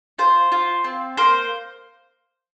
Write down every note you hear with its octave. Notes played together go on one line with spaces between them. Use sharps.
F4 C5
F4
C4
A#3 C5